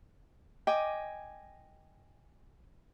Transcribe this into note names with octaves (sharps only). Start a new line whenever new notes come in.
D#5 G5 G#5 D6